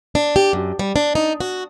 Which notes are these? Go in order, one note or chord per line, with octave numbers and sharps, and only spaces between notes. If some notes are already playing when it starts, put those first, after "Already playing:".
D4
G4
F#2
G3
D4
D#4
F#4